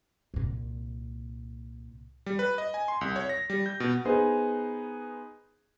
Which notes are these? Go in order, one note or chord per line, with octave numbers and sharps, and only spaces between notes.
C2 A#2
G3
B4
D#5
G#5
C6
C2
C#5
A#6
G3
G6
B2
B3 D#4 G#4 C5